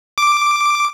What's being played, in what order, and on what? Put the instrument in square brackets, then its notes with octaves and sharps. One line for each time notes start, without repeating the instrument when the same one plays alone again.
[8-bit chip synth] D6